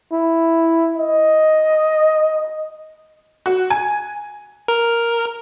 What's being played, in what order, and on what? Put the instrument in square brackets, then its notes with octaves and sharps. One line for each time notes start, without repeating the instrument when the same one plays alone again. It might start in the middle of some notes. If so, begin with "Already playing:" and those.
[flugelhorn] E4
D#5
[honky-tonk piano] F#4
G#5
[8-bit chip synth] A#4